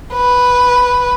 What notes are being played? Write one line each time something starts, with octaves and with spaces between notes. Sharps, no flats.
B4